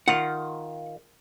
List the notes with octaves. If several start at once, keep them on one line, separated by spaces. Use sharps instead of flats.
D#3 F4 F5 F#5